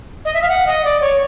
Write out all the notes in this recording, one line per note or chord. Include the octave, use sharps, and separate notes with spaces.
D#5
E5
F5
F#5
D#5
D5
C#5